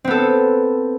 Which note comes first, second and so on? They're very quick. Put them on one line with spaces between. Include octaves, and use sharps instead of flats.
C4 B3 A4